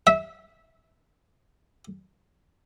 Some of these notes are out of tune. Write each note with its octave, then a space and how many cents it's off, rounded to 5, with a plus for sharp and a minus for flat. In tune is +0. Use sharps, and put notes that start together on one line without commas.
E5 -20